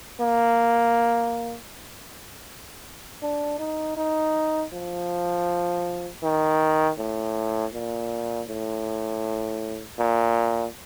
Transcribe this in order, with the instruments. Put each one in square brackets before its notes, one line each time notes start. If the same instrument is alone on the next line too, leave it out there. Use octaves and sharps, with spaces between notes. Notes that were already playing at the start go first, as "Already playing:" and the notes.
[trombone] A#3
D4
D#4
D#4
F3
D#3
A2
A#2
A2
A#2